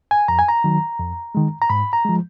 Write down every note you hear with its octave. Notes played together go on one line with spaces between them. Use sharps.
G#5
F2 A#5
G#5
A#5
D#3 F#3
F2
D#3 G#3
A#5
G#2 B5
A#5
F3 G#3